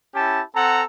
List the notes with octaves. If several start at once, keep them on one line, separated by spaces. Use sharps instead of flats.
C#4 E4 G4 A5
C4 A4 F#5 A#5